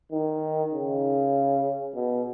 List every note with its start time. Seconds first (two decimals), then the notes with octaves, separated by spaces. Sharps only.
0.12 D#3
0.73 C#3
1.95 B2